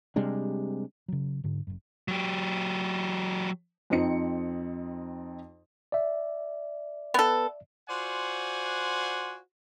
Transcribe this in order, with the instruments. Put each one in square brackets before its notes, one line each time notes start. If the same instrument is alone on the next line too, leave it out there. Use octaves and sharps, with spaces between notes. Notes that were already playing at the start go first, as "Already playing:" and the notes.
[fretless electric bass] C3 G3 G#3 D4
[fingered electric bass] C#3 F#3
G#2 D3 D4
F#1 F#2
[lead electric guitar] F#3 G4
[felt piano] F2 C4 D#4 C#7
[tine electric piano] D5 E5
[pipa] B3 A4
[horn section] F4 F#4 C5 D5 F#5 G#5